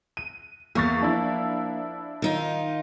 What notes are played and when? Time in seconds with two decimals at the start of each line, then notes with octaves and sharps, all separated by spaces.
0.17 D#7
0.75 E2 A#3 C#6 A6
1.01 F3 D4 E4
2.22 D#3 D#4 F4